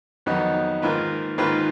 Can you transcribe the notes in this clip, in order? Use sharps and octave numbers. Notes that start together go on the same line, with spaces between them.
F2 D#3 F#3 B3 D#4
G#2 D#3 A#3 F4 B4
G#2 D#3 A#3 F4 B4